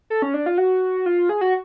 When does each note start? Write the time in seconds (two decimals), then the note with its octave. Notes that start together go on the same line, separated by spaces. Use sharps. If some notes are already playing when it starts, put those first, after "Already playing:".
0.10 A4
0.22 C#4
0.34 D4
0.46 F4
0.58 F#4
1.06 F4
1.29 G#4
1.41 F#4